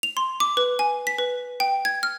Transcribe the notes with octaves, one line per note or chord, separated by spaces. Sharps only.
F7
C6
D6
B4
G#5
B6
B4
G5
G#6
F6